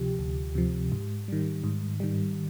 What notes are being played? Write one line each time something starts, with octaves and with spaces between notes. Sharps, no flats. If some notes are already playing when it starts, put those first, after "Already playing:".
Already playing: D2 C3 F3 G4
D2
C3 F3
G#2
D#3 G3
G#2
D#3 G3